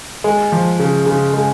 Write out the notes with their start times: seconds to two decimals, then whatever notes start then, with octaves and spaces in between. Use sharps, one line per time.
0.24 G#3
0.52 F3
0.80 C#3
1.06 C#3
1.34 G#3